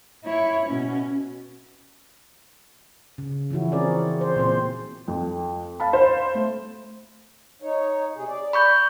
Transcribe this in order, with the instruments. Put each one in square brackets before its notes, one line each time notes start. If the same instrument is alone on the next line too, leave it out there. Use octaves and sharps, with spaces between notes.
[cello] E4 C#5
B2 C#4
[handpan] C#3
E3 F3 C#4 E4 F#4
C4 G#4 A#4 C#5 D5
C5
A#2 C4 C5
[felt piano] F2
F5 A5 B5
[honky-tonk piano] C5
[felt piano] A3
[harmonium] D#4 C#5
C3 G#4
D5
[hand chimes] B5 C#6 G6